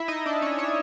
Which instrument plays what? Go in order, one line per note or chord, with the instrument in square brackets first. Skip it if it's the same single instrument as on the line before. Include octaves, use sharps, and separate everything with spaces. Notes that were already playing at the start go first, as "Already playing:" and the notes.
Already playing: [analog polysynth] E4 E5
D#4 D#5
D4 D5
C#4 C#5
C#4 C#5